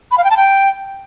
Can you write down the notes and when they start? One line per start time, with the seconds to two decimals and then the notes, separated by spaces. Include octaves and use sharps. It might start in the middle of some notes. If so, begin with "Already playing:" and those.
0.11 B5
0.18 F5
0.24 G5
0.31 A5
0.37 G5